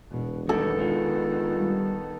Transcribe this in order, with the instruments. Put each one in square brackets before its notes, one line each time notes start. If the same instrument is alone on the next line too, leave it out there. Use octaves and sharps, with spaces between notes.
[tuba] E1 [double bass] B2
[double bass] D#3 B3 [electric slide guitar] G3 E4 F#4 [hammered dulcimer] A4
[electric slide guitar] G#3 D4 F4
[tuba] G3